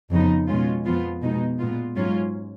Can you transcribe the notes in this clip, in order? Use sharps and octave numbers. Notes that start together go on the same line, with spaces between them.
F2 C#3 F3 B3 D#4
B2 G#3 C#4 F4
F2 F3 B3 F4
B2 G#3 D#4
A#2 G#3 B3 F4
G#2 F#3 C#4 F4